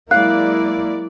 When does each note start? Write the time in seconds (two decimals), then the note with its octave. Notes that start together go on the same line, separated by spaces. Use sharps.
0.11 F#3 G#3 A#3 E4 D5 F5 F#6